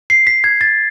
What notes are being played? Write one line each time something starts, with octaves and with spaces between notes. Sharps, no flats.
C7
B6
G#6
A6